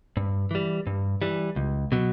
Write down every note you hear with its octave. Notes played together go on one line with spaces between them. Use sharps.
G2
E3 G3
G2
E3 G3
C#2
B2 F#3